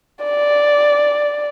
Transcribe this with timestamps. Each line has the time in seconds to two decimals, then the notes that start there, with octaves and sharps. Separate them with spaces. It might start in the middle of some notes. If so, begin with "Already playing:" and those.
0.25 D5